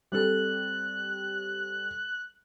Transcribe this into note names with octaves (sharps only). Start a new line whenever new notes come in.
G3 C4 A4 F#6